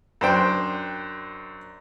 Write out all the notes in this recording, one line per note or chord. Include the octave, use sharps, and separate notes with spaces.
F#2 D4 C5 G5